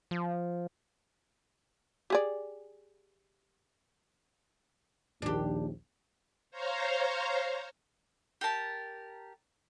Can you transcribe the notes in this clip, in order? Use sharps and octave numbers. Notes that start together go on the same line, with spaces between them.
F3
G4 G#4 D5
A#1 D#2 D4 G4
C5 C#5 F5 A#5
G4 A#4 A5